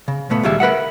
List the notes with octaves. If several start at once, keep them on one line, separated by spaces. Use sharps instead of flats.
C#3
A#2 A3 B3
C#2 D#3 G3 G#3 E5
A#4 B4 E5 F#5